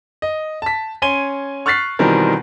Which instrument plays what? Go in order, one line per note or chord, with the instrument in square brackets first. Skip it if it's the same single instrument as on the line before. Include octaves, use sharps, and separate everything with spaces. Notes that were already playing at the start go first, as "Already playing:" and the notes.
[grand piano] D#5
A5 B6
C#4 G#5 C6 D#7 G7
C#6 F6 F#6 A6 B6 C7
B2 D#3 E3 G3 C4 A#4